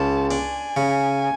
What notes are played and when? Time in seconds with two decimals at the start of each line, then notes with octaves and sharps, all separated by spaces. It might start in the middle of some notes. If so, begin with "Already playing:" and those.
Already playing: C#2 A5
0.31 D4 G#5
0.77 C#3